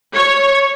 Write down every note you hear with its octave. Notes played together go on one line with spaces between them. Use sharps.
C#5